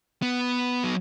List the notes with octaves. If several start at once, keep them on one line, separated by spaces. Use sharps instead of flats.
B3
F#3